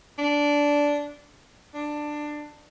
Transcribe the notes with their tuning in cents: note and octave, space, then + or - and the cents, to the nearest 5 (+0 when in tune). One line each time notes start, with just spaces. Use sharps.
D4 -15
D4 +15